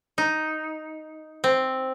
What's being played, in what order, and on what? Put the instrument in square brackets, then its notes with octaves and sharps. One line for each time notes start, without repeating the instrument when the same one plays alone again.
[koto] D#4
C4